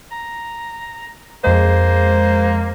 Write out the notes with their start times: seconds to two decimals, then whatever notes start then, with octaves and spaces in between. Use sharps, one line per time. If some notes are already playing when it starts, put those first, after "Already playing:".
0.12 A#5
1.44 F2 G#3 A#3 C5